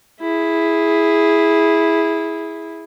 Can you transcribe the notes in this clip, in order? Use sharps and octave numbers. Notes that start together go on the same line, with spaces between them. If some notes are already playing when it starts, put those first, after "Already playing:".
E4 G#4